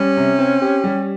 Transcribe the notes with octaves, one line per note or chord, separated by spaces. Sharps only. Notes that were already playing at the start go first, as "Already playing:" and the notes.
Already playing: G3 C#4
C3
C4
G4
G3